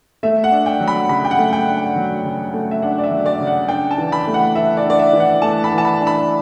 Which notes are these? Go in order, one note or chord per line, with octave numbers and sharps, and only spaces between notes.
A3 E5
F#5
D4
G5
F#3
B5
C#3 B5
G5
F#5
A3
G5
D4
F#3
C#3
A3
E5
D4 F#5
D5
E5
F#3
D5
C#3
F#5
D4 G5
A5
E3
B5
A3
F#5
E3 E5
D5
D4
D5
E5
E3
F#5
A3 A5
B5
E3
A5
B5
D4
B5